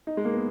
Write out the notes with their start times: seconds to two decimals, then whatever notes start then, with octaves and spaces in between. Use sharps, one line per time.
0.07 D#4
0.17 G#3
0.25 A#3
0.34 B3